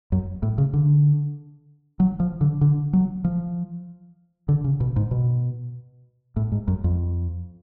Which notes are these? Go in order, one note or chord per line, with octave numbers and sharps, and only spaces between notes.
F#2
A2
C#3
D3
F#3
F3
D3
D3
F#3
F3
D3
C#3
B2
G#2
B2
A2
G#2
F#2
F2